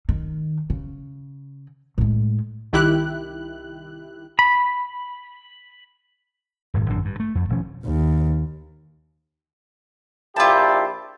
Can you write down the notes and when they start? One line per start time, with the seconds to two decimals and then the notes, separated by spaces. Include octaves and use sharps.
0.09 D#3
0.70 C#3
1.98 A2 G#3
2.73 C2 D#3 E4 G4 F#6
4.39 B5
6.74 D#1 G#1 G#2 B2
6.90 G#1 F#2 A2 D4
7.05 G2
7.20 A3
7.35 F2
7.49 D#1 B2 F3 C#4
7.84 D#2
10.36 A#1 E4 F4 G4 A5